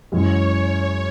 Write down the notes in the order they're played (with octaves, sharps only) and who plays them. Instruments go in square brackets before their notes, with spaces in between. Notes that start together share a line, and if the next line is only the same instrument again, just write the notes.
[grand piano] F#2 E3 G#3 [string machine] C#5